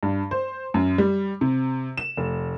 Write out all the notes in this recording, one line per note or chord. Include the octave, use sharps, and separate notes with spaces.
G2
C5
F#2
G3
C3
E7
F1